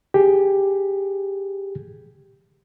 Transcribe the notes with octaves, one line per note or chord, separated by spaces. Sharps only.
G4 G#4